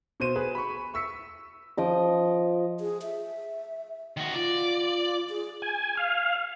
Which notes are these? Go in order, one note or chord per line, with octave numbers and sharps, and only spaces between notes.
B2 C5 D#7 E7
G#4 B4
B5 C#6
C#6 E6 B6 C#7
F3 D#5 D6
G#4
E5
D#3 F#4
F4 D5
G#4
G#5
F5